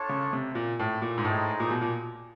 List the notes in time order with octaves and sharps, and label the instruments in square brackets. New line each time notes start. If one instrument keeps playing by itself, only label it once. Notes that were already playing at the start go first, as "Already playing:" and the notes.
Already playing: [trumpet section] D4 F4 A4 C#5
[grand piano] C#3
C3
A#2
A2
A#2
G#2
[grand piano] A2 [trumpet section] G#3 C4 D#4 G#4
[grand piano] A#2
B2
A#2